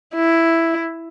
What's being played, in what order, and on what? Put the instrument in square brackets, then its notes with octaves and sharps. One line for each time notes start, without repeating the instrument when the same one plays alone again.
[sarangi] E4